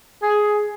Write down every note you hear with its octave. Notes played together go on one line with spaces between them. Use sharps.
G#4